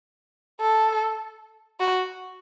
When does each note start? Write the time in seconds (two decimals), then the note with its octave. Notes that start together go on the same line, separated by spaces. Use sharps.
0.61 A4
1.80 F#4